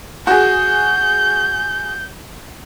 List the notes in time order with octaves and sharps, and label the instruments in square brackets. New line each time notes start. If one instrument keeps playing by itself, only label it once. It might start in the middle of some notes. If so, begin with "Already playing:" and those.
[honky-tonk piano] F#4 G#4 [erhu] G6